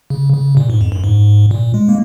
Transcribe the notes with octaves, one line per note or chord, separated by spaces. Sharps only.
C#3
C#3
A#2
G#2
F2
F#2
G#2
A#2
G#3
A#3